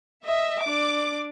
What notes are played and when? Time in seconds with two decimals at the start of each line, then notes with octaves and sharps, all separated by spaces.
0.25 D#5 E5
0.63 D4 D5 D6